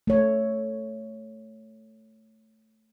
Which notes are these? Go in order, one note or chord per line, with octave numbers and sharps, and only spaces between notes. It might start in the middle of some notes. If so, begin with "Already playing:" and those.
A3 C#5